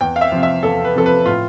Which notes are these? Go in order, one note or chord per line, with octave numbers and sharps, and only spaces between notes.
E2 G5
F5
E5
C3 F3
E5
E2 A4
B4
C3 F3 A4
B4
A2 F4